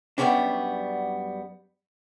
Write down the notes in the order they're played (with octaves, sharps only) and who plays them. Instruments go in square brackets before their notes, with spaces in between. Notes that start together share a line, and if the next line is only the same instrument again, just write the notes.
[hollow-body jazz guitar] F#2 F3 G3 B3 C#4 D4